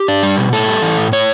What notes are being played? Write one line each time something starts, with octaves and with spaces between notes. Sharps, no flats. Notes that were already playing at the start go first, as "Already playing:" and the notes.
Already playing: G4
D4
G3
B2
A2 A4
G3
E3
A2
A2 C#5